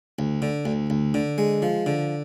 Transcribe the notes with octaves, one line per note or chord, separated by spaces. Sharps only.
D2
D3
D2
D2
D3
G#3
F3
D3